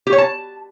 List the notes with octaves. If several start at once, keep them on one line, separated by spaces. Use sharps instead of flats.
G4
C#5
A5